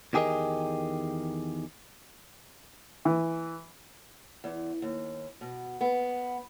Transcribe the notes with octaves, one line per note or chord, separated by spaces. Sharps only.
E2 D#3 G4 G#4 A#4 D#5
E3
E2
D#2
B2
B3